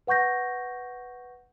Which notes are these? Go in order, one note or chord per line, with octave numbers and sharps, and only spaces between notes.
B4 F#5 C#6 G6 A#6